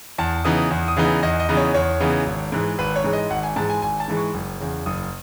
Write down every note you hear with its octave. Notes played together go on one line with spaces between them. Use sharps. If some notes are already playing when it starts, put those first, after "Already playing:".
E2 A5
C#3 E3 B3 D#4 D#6
E2
D#6
C#3 E3 B3 D#4
E2 D#5
D#5
C#3 E3 B3 D#4
C#5
E2 C#5
C#3 E3 B3 D#4
G#1
G#2 E3 G#3
G#1 B4
C#5
G#2 E3 G#3
D#5
G#1 F#5
G#5
G#2 E3 G#3 A5
G#5
G#1 G#5
A5
G#2 E3 G#3
C#6
F#1
E2 C#3
F#1 D#6